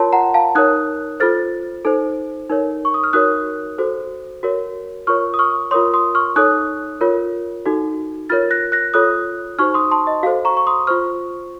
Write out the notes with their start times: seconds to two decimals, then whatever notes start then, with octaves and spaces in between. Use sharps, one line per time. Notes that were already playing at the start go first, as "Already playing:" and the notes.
Already playing: F4 A#4 C#5 A5 C6
0.13 F#5 A#5
0.34 F5 A5
0.55 D#4 A#4 C#5 D#6 F#6
1.20 F4 A4 C5 F6 A6
1.85 D#4 A4 C5
2.50 D#4 A#4 C#5
2.85 C#6
2.94 D#6
3.04 F6
3.13 D#4 F#4 A#4 C#5 D#6 F#6
3.78 F#4 A4 C5
4.43 F#4 A#4 C#5
5.07 F4 A#4 C#5 C#6 F6
5.34 D#6
5.39 C#6 F6
5.71 F4 A#4 C#5 C6 D#6
5.94 C6 D#6
6.15 C#6 F6
6.36 D#4 A4 C#5 D#6 F#6
7.01 F4 A#4 C#5
7.66 D#4 F#4 A4
8.29 F4 A#4 C#5 F6 A6
8.51 F#6 A#6
8.72 F#6 A#6
8.94 F4 A4 C#5 D#6 F#6
9.59 D#4 F#4 C5 C#6 F6
9.74 C6 D#6
9.91 A5 C6
10.07 D#5
10.23 F#4 A4 C5 F5
10.45 A#5 C#6
10.57 C#6
10.67 C6 D#6
10.87 F4 C5 C#6 F6